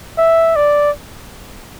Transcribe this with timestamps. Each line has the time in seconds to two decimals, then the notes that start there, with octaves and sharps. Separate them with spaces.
0.18 E5
0.56 D5